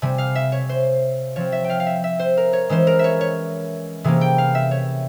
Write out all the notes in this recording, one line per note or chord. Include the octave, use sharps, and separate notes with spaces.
C3 G3 C4 G#5
F5
E5
C#5
C5
F3 C4 C#5
E5
G5
F5
F5
E5
E5
C5
A#4
C#5
E3 G#3 C#4 C5
A#4
C#5 E5
C#5
C3 E3 A#3 C#4 G#4
G5
F5
E5
C#5